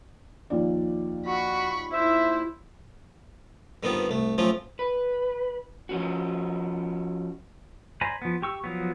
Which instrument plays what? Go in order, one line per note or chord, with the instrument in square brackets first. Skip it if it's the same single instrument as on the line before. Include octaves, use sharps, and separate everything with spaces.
[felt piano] D#2 F3 D5
[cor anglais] F#4 [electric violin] B5 C#6
[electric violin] E4 [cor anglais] C5 [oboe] E5
[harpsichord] G2 D3 D#3 B3 C4 F4
C2 A3
F3 F#3 A3 C4 C#4 F4
[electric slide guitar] B4
F3 C#4 F#4
[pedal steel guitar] C5 D5 G#5 A#5 B5
F3 B3
G4 C#6 E6
F3 F#3 B3